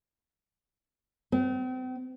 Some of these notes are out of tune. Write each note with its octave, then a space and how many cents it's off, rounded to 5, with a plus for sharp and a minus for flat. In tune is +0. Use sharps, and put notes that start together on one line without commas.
C4 -40